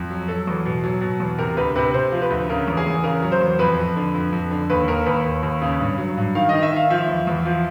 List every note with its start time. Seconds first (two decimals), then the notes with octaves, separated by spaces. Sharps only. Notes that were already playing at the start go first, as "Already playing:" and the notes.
Already playing: F2
0.10 F#3
0.28 F#3 A4
0.47 E2
0.65 B2
0.84 F#3
1.01 B2
1.20 E2
1.38 C3 A#4
1.57 D2 B4
1.75 C3 B4
1.93 C3 C5
2.12 F3
2.22 B4
2.30 D2
2.50 C#3 A#4
2.67 E2
2.77 G#4
2.86 E2
3.04 C#3 A#4
3.23 F#3
3.32 C5
3.41 E2
3.59 F2 B4
3.78 F2
3.97 D3
4.14 F2
4.32 F2
4.51 D3
4.70 D#2 B4
4.88 D#2 A#4
5.06 D#2 B4
5.25 D#2
5.43 D#2
5.61 C#3
5.80 G2
5.98 F#3
6.17 G2
6.35 D#3 F5
6.49 D#3 D#5
6.63 E5
6.72 D#3 F5
6.90 F3 E5
7.08 E2
7.27 E2
7.45 F3